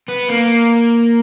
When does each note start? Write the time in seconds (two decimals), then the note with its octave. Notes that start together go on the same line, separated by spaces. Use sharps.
0.09 B3
0.30 A#3